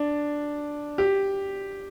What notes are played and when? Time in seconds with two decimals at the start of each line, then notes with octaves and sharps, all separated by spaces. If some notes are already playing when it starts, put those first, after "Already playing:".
Already playing: D4
0.98 G4